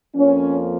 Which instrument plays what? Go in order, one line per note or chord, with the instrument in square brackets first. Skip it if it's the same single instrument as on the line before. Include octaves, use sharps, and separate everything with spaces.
[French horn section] F2 F3 A#3 C#4